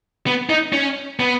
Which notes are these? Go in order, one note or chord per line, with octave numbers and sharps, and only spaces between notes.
B3
D#4
C#4
B3